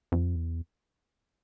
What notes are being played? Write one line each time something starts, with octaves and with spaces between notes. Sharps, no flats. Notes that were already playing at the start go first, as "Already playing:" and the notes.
F2
E2